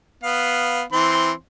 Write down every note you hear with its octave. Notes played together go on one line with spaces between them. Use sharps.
B3 F5
E3 C4 C6